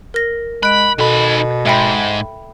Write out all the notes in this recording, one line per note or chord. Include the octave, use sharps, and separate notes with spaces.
A#4 A#6
G#3 B5 F#6 D7
B2 D#3 A4 B5
G#2 E5 G5 B5